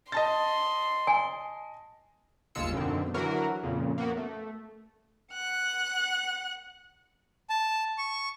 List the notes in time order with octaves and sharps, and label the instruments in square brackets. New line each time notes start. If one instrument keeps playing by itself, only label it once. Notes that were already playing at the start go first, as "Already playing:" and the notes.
[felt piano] D#5 A5 A6 [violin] C6
[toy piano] G#5
[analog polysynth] G1 D#2 G#3 F4 E6 C#7
F#2 B2 D3 D#3 C4
D3 E3 F#3 F#4 A#4
F2 A#2 C#3
A#3 B3 F#4
A3
[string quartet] F#5 F#6
[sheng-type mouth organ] A5
C#6